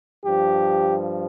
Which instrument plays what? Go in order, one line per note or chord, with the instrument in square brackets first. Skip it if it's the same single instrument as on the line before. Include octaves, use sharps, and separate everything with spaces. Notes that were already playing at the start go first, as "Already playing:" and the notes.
[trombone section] G2 F3 G4